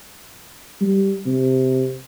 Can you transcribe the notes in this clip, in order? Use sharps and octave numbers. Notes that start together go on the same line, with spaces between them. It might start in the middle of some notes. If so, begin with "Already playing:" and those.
G3
C3